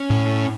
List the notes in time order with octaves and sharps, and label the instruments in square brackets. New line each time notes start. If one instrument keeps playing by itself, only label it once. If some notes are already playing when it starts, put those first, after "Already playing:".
Already playing: [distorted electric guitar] C#4
[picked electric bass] A2